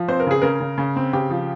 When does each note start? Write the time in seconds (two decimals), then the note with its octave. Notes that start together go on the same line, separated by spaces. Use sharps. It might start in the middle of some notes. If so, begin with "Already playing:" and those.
Already playing: F3
0.08 C4 C5
0.20 A#4
0.27 C#3 G#4
0.42 C#3 A#4
0.60 C#3
0.78 C#3
0.96 C4
1.13 C#3 G4
1.30 F3